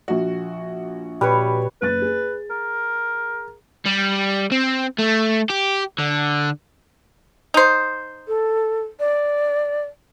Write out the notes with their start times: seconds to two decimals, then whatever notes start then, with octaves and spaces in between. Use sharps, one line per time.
0.08 A#1 F#4
1.21 A#2 G3 B4 C#5
1.82 F#1 B4 A6
2.02 G#4
2.50 A#4
3.86 G3
4.52 C4
4.99 A3
5.50 G4
5.99 D3
7.54 D#4 C5
8.28 A4
9.00 D5